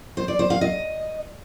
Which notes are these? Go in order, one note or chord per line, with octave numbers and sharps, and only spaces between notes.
C5
D5
C5
F5
D#5